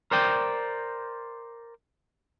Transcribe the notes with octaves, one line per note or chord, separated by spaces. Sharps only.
A#4 C5 D5 G5